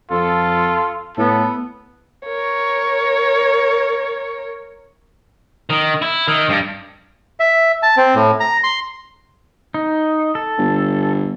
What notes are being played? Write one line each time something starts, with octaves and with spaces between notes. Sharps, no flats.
F2 F4 A4
A2 B3 A4
A#4 C#5
D#3
E4
D#3
G2
E5
A5
C4
A2
A#5
C6
D#4
A4
G1